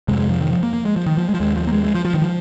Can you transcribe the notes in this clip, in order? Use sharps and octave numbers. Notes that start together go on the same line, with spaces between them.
F2 C3 G#3
G#3
F3
D#3
F3
A#3
A#3
G#3
F3
D#3
F3
G#3
F3
D#2 G#3
F3
A#3
G#3
G#3
F3
F3
D#3
F3